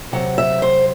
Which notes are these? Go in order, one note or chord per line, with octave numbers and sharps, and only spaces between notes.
C3 F#3 C4 F#5
E5
C5